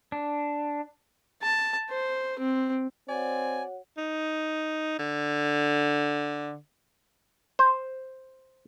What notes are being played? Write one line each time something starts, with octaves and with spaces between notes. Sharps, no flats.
D4
A5
C5
C4
C4 F#4 C#5 D5 F#5 G#5
D#4
D3
C5